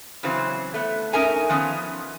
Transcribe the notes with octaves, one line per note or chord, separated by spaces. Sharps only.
C#3 E3 F#3 C4 C5
A3 B3
C#4 D#4 A#4 E5 G#5 A#5
D#3 F3 B3 C#4